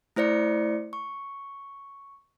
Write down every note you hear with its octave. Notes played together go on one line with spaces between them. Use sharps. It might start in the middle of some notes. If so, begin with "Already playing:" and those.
A3 E4 C5 D5 C#7
C#6